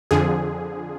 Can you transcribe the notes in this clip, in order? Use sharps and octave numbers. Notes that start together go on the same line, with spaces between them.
F2 D3 F3 G#4